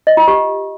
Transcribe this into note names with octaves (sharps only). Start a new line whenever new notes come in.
D#5
F4
G4